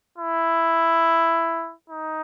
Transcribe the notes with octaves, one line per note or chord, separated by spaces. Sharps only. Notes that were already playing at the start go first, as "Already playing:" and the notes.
E4
D#4